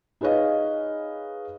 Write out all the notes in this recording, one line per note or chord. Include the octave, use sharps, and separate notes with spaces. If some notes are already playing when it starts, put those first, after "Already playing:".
D#4 G#4 B4 C#5 D#5 F5